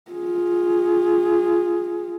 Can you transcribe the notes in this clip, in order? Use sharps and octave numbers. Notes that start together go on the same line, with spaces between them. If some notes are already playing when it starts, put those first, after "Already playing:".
F4 G#4